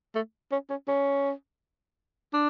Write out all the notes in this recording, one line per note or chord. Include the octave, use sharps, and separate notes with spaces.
A3
C#4
C#4
C#4
D4